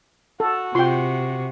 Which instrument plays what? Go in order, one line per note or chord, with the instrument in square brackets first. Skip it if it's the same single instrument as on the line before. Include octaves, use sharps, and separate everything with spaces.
[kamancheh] F#4 [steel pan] A4
[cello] C3 [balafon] F4 [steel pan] G5 C6